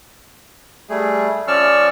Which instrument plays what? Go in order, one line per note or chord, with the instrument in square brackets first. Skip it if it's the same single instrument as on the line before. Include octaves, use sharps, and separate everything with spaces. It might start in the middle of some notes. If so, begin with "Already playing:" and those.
[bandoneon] G3 A3 G#4
[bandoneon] F3 C#4 C#6 [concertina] D5 E6 F6